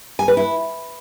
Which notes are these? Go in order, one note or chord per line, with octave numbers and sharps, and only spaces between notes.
G#5
B4
E4